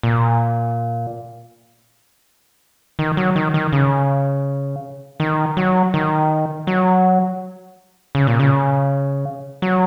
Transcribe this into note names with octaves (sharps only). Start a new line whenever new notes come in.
A#2
D#3
F#3
D#3
D#3
C#3
D#3
F#3
D#3
F#3
C#3
A#2
C#3
F#3